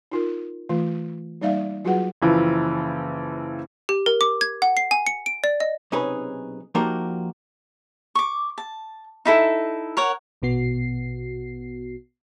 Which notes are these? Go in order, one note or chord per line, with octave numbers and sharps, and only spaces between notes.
D#4 F4 A#4
E3 A3 F4
G3 A#3 D#4 D5 E5 F5
F#3 F4 F#4 G#4 B4 F#5
F#1 E3 F3
G4
A#4
D6
G#6
F#5
C7
G#5
C#7
D7
D5
D#5
B1 C3 C#4 D#4 G#4 B4
F3 A#3 D#4 F#4 G4 A#4
C#6 D6
A5
D#4 E4 A4
A#4 C#5 F#5
A#1 B2 B3 F#4 C7